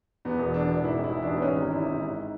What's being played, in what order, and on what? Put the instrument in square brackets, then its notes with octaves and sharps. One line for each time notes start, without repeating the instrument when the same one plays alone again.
[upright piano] E2 B3
E1
B2 D4
E1
G#2 E4
A1
E4
E3
D4
A1
B3
G#2 C#4
G#1
E3 E4
G#1
G#2